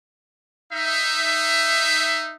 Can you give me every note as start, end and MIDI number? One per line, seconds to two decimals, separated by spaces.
0.72 2.34 63
0.72 2.34 76